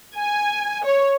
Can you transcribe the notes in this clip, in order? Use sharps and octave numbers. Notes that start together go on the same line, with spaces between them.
G#5
C#5